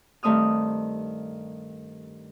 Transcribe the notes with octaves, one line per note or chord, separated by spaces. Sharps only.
G2 D#3 A3 C4 D#6 F6